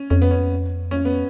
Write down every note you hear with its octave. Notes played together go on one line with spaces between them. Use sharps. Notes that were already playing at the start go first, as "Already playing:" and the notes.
Already playing: C#4
F2 C#4
B3
C#4
C#4
B3